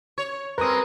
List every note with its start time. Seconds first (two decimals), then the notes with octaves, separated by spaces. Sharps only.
0.18 C#5
0.58 G3 G#3 C4 A#4 B4 D#6